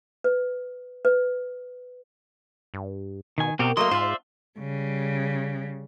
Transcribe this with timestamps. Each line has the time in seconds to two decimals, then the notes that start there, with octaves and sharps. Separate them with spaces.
0.24 B4
1.05 B4
2.74 G2
3.38 B2 D#3 G#5
3.59 B2 C4 F#4 G4 A#4
3.77 F#3 A3 A#3 D#5 C6
3.91 G#2 F4 C5 D5 E5
4.59 C#3 G3